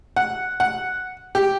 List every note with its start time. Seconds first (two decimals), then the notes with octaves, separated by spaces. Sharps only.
0.16 F#5
0.60 F#5
1.35 G4